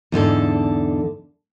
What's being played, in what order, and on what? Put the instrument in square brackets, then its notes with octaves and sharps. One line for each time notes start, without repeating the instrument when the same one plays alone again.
[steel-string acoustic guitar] E2 G#2 D3 A4